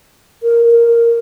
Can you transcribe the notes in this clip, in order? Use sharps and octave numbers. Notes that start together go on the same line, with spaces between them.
A#4
A#4